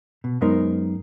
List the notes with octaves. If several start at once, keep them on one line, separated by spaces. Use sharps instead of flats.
B2
F#2 G#3 B3 D#4 A#4 C5